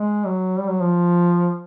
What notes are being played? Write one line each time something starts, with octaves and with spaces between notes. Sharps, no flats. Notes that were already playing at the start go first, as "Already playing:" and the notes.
Already playing: G#3
F#3
G3
F#3
F3